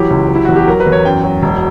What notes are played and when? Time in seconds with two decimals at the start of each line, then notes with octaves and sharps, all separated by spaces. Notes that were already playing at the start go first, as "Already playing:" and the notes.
Already playing: E3 F#3 G4
0.10 C#2
0.29 F#3
0.35 E4
0.45 E2 F#4
0.56 G4
0.68 F#3 A#4
0.80 B4
0.86 E2
0.92 C#5
1.05 F#2 G5
1.23 F#3
1.42 E1